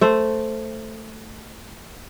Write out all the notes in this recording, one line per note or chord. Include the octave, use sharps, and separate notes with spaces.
A3 C5